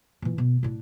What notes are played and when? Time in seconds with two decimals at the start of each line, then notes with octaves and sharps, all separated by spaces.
0.22 A#2 E3
0.38 B2
0.63 A2 D4